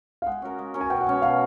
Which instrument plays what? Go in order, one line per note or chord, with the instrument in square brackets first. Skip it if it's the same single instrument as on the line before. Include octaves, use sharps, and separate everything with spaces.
[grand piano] F5
[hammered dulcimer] G#3 [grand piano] F#5
[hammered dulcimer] C#4 F#4 A#4
G#3
C#4 F#4 A#4
[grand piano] G#5
[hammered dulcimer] B2 [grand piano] G5
[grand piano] F#5
[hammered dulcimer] G#3 C#4
[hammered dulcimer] B2 [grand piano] F5